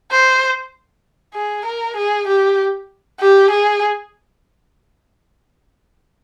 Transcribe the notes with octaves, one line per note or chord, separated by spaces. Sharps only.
C5
G#4
A#4
G#4
G4
G4
G#4